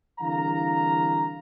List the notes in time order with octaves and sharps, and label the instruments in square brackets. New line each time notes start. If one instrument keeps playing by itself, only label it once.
[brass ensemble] C2 D3 E3 F5 A#5